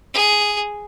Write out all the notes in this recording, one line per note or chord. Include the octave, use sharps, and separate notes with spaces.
G#4